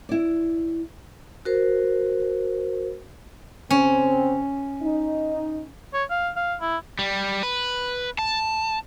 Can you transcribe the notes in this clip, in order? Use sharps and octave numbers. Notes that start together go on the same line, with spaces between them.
E4 D5
F#4 A#4 C5
C#3 C4 C#4
D#4
C#5
F5
F5
E4
G3
B4
A5